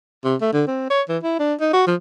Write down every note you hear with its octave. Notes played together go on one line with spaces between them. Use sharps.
C3
A3
D3
C4
C#5
E3
E4
D4
D#4
F#4
F3